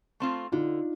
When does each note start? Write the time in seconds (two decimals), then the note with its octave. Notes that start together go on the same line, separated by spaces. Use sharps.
0.20 A3 C4 F4
0.52 D3 D#4 F4